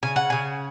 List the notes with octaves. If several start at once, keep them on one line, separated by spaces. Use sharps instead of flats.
C#3 G#5
F#5
C#3 G#5